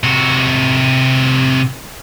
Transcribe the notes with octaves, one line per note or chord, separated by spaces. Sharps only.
C3 F#4